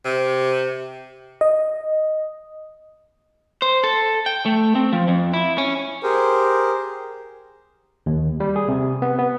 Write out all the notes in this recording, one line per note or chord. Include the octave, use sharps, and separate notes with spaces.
C3
D#5
C5
A4
G5
A3
C4
F3
F2
E4
C#4
G4 G#4 A#4 C5
D#2
G3
G#4
C3
B3
B3